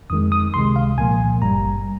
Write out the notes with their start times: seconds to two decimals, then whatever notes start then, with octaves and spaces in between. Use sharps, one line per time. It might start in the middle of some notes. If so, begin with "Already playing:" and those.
0.10 F2 D#3 G#3 D#6
0.32 D#6
0.54 C#2 C3 D#3 G#3 C6
0.76 F5
0.97 C2 A#2 F3 A#3 G#5
1.42 G#1 G2 G3 A#5